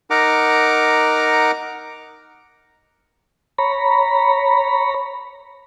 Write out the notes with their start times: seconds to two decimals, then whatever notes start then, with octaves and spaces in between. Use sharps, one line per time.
0.10 D#4 A#4 F#5 A#5 D6
3.59 C#5 A#5 B5